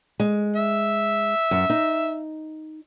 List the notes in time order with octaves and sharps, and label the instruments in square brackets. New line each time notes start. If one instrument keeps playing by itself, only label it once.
[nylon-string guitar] G#3
[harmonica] E5
[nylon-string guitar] F#2
D#4